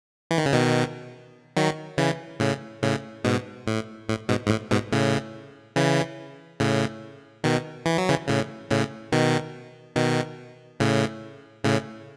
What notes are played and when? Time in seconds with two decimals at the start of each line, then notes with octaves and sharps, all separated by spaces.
0.31 E3
0.38 D#3
0.46 C#3
0.53 B2 D#3
1.57 D#3 F#3
1.98 C#3 E3
2.40 A2 C#3
2.83 A2 C#3
3.24 G#2 B2
3.67 A2
4.09 A2
4.29 G#2 B2
4.46 G#2
4.50 A2
4.71 G#2 B2
4.92 A2 C#3
5.76 C#3 E3
6.60 A2 C#3
7.44 B2 D#3
7.86 E3
7.98 F#3
8.09 C#3 E3
8.28 A2 C#3
8.71 A2 C#3
9.12 B2 D#3
9.96 B2 D#3
10.80 A2 C#3
11.64 A2 C#3